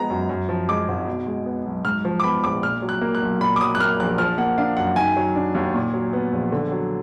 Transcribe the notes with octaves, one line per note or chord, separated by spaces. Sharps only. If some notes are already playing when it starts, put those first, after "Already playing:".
Already playing: F3 G#3 B3 A#5
F#2
F#2
F3
G#3 D6
G#1
B2
G#3
B3
B1
G#2 F6
F3
D6
B3 B5
A#1 D6
A#2 F6
F#3
F#6
A#3
F#6
B1
A#2 B5
D6
F#3 D#6
F#6
A#3 F6
A#1 F#6
F3 F6
A#3 F#5
D4 F5
F#2 F#5
D#3 G#5
F#3
D4
D#2
A#2
F#3
B3
A#1
D3
F#3